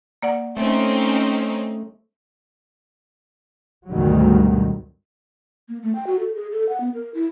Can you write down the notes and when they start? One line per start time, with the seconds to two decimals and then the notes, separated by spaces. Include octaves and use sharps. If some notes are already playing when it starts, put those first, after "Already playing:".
0.22 A#3 D5 F#5
0.57 A3 C4 C#4 D#4
3.90 D2 G#2 B2 D#3 F#3 G3
5.69 A#3
5.83 A3
5.95 G5
6.07 F#4
6.19 A4
6.35 G#4
6.52 A4
6.69 F#5
6.80 B3
6.94 A#4
7.14 E4